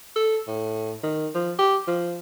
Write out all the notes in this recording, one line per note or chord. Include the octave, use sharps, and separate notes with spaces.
A4
A2
D#3
F3
G4
F3